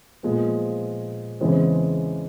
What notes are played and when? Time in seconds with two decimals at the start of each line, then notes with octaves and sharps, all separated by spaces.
0.23 A#2 F3 G#3 B3
1.41 E2 C#3 E3 G#3 C4